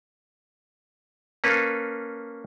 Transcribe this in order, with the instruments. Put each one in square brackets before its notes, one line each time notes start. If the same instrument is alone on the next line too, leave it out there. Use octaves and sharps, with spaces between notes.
[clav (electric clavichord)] A#3 C#4 A4 B4